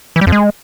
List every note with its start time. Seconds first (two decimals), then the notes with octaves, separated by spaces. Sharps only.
0.16 E3
0.21 G3
0.27 F2
0.32 G#3